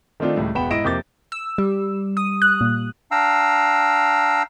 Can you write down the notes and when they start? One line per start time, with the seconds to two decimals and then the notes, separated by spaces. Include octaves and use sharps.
0.20 D#3 A3 C4 D4 F4
0.36 C#2 A2 G3
0.55 E1 B3 F#5 G5 B5 E7
0.70 G#2 E4 D#5 A#6 D7 E7
0.84 F2 C3 A#3 D6 G6 A6
1.32 E6
1.58 G3
2.17 D#6
2.42 F#6
2.61 A#2
3.11 D4 F5 G5 A#5 E6